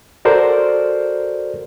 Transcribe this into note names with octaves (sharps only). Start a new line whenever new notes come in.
F#4 A4 A#4 C5 D5